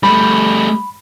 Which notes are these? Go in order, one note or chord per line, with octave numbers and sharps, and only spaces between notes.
G3 A3 B5